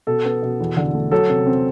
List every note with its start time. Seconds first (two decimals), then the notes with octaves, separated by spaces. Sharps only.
0.07 B2 A4
0.25 B3
0.43 B2
0.60 E2
0.77 D3
0.94 A3
1.11 F#3 A4
1.29 C3
1.47 C4